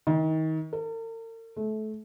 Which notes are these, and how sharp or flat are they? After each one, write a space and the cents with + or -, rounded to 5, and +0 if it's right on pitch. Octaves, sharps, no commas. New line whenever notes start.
D#3 +30
A#4 -45
A3 -25